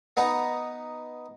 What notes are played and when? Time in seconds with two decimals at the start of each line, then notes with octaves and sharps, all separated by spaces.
0.17 B3 D#4 B4